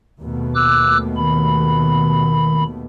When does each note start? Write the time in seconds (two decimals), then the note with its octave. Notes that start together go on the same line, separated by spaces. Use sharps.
0.21 D#2 B2 A3
0.55 D6 E6 F#6
1.17 D#3 B5